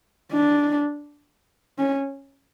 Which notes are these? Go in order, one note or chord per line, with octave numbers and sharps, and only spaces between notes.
D4
C#4